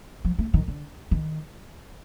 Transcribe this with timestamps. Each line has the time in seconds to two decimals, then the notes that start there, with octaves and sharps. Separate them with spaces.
0.25 F3
0.39 A3
0.54 D#3
0.68 D3
1.11 D#3